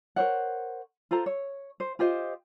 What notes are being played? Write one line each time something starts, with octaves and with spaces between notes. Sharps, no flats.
A#4 C5 C#5 F#5
F4 A4 C5 A#5
C#5
C5
F4 G4 C5 D#5